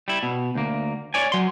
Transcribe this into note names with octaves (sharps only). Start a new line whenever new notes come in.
G3 E4
B2
D2 A#3
C#5 D5 G#5
F#3 C6